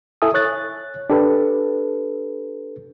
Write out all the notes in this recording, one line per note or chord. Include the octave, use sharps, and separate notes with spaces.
E4 A4 E5 G#5 D#6
C#5 F#6 A6
D4 G4 A4 B4